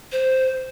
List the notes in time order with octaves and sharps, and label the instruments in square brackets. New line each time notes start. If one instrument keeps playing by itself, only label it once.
[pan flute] C5